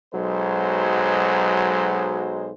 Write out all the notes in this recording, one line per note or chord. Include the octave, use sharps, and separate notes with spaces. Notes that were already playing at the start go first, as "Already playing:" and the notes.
B1 F#3 G#3 C5